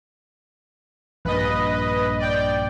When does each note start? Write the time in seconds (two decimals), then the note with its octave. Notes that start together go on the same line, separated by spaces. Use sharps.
1.25 A#1 G2 B4 D#5
2.20 D5 G5